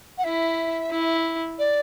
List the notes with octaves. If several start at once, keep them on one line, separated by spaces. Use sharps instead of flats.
F#5
E4 E5
E4
D5